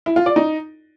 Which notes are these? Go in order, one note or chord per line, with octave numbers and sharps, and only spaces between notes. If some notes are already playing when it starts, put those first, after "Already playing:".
E4
F4
D5
D#4